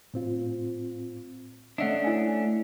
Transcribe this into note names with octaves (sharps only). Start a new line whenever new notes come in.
A2 C4 F4
A3 C#4 D4 D#5 E5 F#5
E4 G#5